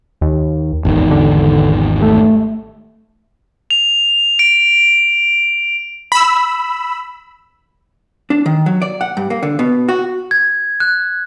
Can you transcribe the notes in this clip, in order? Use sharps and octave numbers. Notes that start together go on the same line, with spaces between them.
D#2
D#1 G#1 E2 D#3
D3
A3
F7
D7
B5 E6
D4
D#3
F#3
D5
F#5
G2
A#3
D3
B2
F#4
G#6
F#6